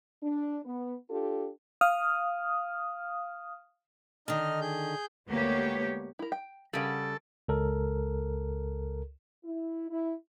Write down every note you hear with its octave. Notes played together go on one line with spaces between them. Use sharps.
D4
B3
D4 F4 G4 A4
F5 D#6 F6
D3 D#3 D#4 D#5 F6
G#4 G6
D2 G#3 A#3 B3 G4 C#5
E4 A#4
G5
C#3 G3 A4 A#4 F#5
C#2 A4 A#4
E4
E4